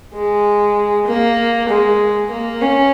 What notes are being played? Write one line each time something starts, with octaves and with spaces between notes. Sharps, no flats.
G#3
A#3
G#3
A#3
C#4